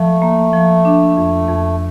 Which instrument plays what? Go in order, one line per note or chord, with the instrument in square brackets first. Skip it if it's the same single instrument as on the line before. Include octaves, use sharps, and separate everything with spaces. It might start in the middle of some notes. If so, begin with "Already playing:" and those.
Already playing: [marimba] F3 [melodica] A3
[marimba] A#3
F3
D4
F2
F2